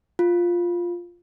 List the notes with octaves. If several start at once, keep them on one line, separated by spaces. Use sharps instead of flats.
F4